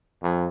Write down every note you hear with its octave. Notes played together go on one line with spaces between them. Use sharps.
F2